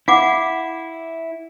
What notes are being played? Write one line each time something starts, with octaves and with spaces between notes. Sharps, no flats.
E4 F5 F#5 D6